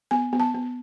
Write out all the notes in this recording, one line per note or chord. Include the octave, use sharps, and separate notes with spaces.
B3 G#5
B3
A5
B3